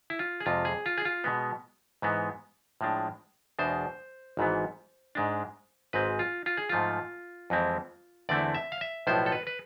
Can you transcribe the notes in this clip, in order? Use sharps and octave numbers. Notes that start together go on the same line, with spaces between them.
E4
F4
G#4
F2 C3 G#3 F4
G#4
F4
G#4
F4
B2 G#3 B3
G#2 E3 G#3 B3
A2 F3 G#3 D4
E2 B2 G#3 D4 C5
G#1 G#2 E3 B3
G#2 G#3 D4
G#1 G#2 G#3 C4 B4
F4
F4
G#4
G#2 F3 A3 F4
F2 E3 G#3 C4 E4
E2 D3 A3 C4 E4 D5
E5
F5
E5
B1 A2 F3 B3 E4 C5
A4
B4
B4